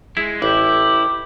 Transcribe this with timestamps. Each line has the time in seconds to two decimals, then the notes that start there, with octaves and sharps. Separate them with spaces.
0.17 G#3 E4
0.42 A1 E4 G4